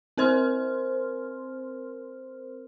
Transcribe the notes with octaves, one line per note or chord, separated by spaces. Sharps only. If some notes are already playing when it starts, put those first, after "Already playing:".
C4 A#4 C5 C6 F6